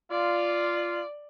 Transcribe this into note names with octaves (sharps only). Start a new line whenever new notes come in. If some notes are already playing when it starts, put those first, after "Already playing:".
F4 D5